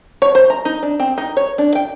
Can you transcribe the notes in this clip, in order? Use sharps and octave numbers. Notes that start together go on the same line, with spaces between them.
C#5
C5
A#5
D#4
D4
C4
D#4
C#5
D4
G5